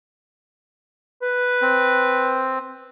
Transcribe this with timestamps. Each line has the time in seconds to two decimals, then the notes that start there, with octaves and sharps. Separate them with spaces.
1.22 B4
1.62 C4